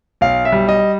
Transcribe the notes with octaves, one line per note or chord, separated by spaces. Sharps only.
B1 F5
E5
G3
D#5